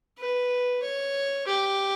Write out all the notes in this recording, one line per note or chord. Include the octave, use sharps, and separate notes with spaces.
B4
C#5
G4